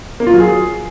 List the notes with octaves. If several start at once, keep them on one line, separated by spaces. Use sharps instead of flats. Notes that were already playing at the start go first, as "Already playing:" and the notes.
A#3
F4
F#3
G#4